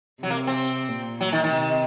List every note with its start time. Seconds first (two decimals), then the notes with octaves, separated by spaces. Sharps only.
0.22 C3 F#3
0.30 A#3
0.47 C4
0.89 A#2
1.21 F#3
1.32 D#3
1.43 D#3
1.54 C3